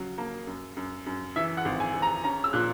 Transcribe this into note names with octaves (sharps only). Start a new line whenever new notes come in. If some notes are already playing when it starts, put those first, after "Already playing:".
Already playing: C#3 F#3
A#3
F#2
F#2
F#2
E3 E5
F#5
G#1
G#5
G#1
A#5
C#4 A#5
E6
A#2 F#6